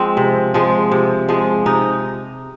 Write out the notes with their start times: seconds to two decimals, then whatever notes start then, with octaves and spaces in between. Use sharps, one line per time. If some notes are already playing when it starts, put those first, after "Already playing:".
Already playing: F3 G#3 C4
0.17 C3
0.54 F3 G#3
0.92 C3
1.29 F3 G#3
1.66 C3 D#4